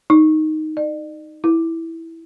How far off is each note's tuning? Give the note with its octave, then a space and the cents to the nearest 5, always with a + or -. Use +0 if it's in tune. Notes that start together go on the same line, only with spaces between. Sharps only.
D#4 +0
D5 +45
E4 -5